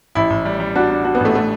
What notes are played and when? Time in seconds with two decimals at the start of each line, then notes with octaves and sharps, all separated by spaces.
0.15 A1 E4
0.30 A1
0.45 G3
0.60 G3
0.76 D4 F#4
0.90 D4
1.05 D4 F#4
1.15 B3
1.20 A1 A3
1.35 A3